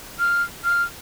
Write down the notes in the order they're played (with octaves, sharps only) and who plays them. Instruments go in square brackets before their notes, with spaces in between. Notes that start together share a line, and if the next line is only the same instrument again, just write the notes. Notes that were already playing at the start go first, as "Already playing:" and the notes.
[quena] F6
F6